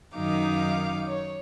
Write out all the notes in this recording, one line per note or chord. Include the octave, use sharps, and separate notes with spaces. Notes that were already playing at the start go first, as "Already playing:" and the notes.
F#2 D#3 D#4 F5 D6
C#5